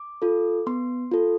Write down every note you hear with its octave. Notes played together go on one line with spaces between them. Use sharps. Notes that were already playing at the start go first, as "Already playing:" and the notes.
Already playing: D6
F4 A4
B3 C6
F4 A4